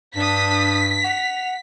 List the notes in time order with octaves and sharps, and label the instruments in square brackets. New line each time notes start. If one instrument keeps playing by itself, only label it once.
[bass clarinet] G2 [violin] D4 D#6 [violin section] B6
[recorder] F#5 [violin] F7